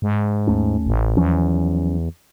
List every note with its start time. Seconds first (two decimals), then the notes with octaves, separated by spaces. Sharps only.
0.02 G#2
0.47 D#2 A3 C#4
0.86 A1
1.17 E2 F3 F#3 C#4